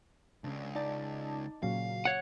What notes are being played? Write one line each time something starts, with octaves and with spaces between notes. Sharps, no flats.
C#2 C#3 D4
D#4 D5 A5
A#2 C#3 F#3 F5
C#5 F#5